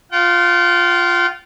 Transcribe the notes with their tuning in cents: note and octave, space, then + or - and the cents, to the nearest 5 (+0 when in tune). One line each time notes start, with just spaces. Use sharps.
F4 +0 G5 -45